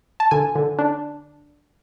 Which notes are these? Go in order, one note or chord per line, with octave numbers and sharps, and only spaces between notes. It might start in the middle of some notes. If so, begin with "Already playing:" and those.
A5
D3 G#5
D3
D4